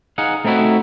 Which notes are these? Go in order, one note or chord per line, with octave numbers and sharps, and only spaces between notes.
D#4 G#4 F5 F#5
A3 C4 D#4 E4 F#4